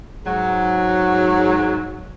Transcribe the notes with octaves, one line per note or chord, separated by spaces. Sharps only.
G#2 F#3